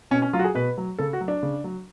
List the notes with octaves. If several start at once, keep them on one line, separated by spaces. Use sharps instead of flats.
B2 C#4
C#4
F#3 F4
F#4
G#4
B2 B4
F#3
C#3 A4
F#4
F#3
D4
C#3
F#3